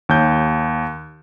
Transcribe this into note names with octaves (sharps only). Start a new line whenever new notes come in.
D#2 G6